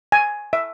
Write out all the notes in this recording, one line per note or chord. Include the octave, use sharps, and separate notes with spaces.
G#5
E5